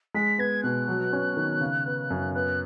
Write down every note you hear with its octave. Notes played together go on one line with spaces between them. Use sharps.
G#3 B6
B3 G#6
B2 F#6
F#3
C#4
D#3
C#3
B3
F#2
B3 F#6